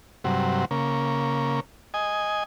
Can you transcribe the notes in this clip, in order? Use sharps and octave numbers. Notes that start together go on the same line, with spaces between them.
G2 C3 F#3
C#3 A#3
D#5 G#5